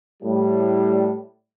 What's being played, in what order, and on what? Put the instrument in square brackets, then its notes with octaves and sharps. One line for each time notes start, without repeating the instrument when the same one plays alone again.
[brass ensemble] A2 G3